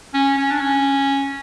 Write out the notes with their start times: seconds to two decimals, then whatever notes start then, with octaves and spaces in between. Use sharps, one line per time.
0.14 C#4
0.37 C#4
0.51 D4
0.60 C#4